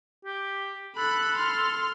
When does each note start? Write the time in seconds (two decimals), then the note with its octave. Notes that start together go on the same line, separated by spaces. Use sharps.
0.25 G4
0.96 A4 B5 F#6
1.37 C6 F6